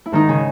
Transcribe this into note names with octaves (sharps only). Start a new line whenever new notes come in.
E4
G#2 D#3 D#4
C#3 C#4